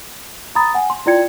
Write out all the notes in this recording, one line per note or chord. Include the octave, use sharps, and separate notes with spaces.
A#5 B5 D#6 A6
F#5 G#5
C6
E4 F4 D5 G5 G#6 C#7